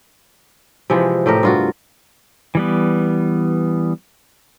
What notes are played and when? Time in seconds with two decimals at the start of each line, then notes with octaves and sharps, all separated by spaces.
0.90 C3 E3 F3 G#3
1.26 A2 A3 G4 A#4
1.43 G2 F4 F#4
2.55 E3 G3 B3